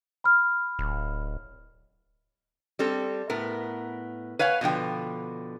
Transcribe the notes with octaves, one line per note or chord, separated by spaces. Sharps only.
B5 F6
D1
G3 C4 A4
A2 B3 A#4
B4 C#5 F5 F#5 G#5
B2 D3 F3 G5